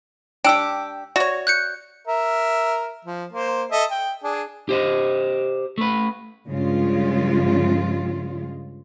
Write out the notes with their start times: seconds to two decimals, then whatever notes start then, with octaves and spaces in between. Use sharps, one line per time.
0.44 D4 G4 G5 E6 D7
1.16 F#4 C#5 D5 E5
1.47 F#6 G6 C#7
2.08 A#4 E5
3.05 F3
3.33 A#3 C5
3.71 A4 D#5 E5
3.91 G5
4.24 D4 G#4
4.69 G4 C5 D#5
5.78 A3 B4
6.49 G2 C#3 F3 G#3 F4